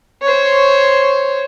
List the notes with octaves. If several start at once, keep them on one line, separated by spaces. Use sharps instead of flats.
C5 C#5